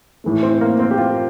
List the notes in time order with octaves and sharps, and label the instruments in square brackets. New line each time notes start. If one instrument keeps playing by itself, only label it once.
[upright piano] A2 E3 A3
[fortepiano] C4
A#3
C4
G4
F4